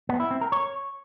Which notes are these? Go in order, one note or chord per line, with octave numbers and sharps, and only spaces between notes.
B3
E4
C4
A#4
C#5